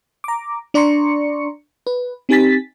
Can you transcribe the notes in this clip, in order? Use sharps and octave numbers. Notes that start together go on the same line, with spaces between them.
A#5 D6
D4 D5 A#5 C6 C#6 C#7
B4
C4 D#4 G4 G#5 A6 B6